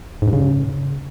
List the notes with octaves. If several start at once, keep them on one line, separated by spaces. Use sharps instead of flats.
G#2
G2
C#3